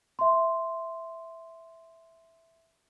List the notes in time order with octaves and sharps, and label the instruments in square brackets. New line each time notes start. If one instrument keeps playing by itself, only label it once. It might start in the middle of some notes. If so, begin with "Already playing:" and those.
[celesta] E5 C6